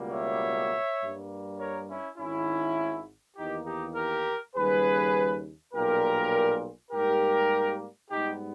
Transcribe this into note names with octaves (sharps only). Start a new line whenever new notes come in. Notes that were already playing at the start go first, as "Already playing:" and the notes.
Already playing: C#2 B2 G3 A#3
C#5 E5
G2 G3 A#3
A#4 C#5
C#4 E4
G#1 G#2 D#3 C#4 E4
E2 D#3 A#3 D#4 G4
D#4 G4
G4 A#4
D#2 C#3 G3 G#4 B4
B1 A#2 G3 G4 A#4
G#2 G3 A#3 G4 A#4
G#2 G3 B3 D#4 G4